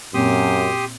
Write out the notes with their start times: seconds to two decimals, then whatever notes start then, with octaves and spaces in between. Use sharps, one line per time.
0.14 F#2 A#2 A#3 C4 G4 C6 D#6